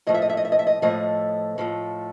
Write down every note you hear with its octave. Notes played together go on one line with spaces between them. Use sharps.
A2 F3 A3 D#5
E5
D#5
E5
D#5
E5
D#5
E5
D#5
A2 F3 A3 D#5
A2 F3 A3